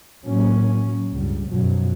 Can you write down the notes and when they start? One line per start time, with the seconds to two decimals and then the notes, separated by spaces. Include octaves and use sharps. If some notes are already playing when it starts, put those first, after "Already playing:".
0.25 A2 F#3 A#3 C#4
1.12 C#2 G2 G3
1.49 F#2 B2 F3 F#3